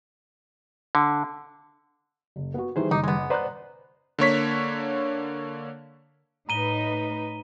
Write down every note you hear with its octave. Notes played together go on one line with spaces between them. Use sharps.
D3
F#1
B3 F#4
D#3 E3 G3 G#4 C5
F#1 D#3 G3 D#4 D6
G#3 B3
B4 C5 D5 A#5 F#6
D3 A#3 C#5 B6
A2 D#4 B4 A#5 D#7 G7